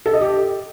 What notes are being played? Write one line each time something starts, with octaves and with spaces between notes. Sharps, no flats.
A4
D#5
G4